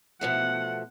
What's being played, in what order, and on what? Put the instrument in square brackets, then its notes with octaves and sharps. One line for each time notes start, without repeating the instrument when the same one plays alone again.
[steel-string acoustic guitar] B2 F3 A3 [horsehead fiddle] F#5